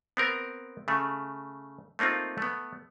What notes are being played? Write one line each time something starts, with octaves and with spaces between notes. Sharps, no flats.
B3 C4 A#4
C#3 A3
A3 A#3 C4 D#4 F4
A3 B3